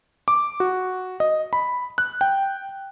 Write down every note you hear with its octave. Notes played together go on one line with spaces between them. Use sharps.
D6
F#4
D#5
B5
F#6
G5